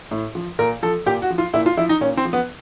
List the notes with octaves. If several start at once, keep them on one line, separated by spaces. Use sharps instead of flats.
A2
F3
A#2 A#4
F3 A4
A#2 G4
F#4
F3
F4
A#2 E4
F4
F3 E4
D#4
A#2 C#4
C4
F3
B3